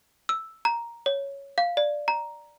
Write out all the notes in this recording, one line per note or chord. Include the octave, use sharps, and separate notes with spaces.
E6
A#5
C#5
F5
D5
A#5